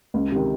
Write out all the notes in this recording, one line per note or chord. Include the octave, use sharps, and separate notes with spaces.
C#2
C3 D#3